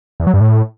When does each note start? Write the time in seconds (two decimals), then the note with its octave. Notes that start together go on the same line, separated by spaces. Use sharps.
0.20 E2
0.27 F#3
0.34 G2
0.41 A2